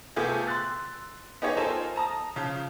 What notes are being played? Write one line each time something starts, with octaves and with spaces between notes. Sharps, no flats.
C3 A3 B3 F4 G#4 A4
C6 E6 F#6 A6
B3 D#4 G4 G#4 C#5
D#4 F4 A4 A#4 C5 G#5
A5 A#5 D#6
C#3 F3 F4